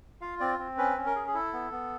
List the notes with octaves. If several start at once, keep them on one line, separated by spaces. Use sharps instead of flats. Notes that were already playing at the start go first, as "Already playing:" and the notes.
F4 F5
C4 D5
C4
C#4 B4
C#4
A#4
G#4
G#4
E4 A4
B3
B3